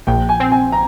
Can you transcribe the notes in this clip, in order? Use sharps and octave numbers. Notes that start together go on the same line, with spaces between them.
A#1 G5
G#5
C4
G#5
A#5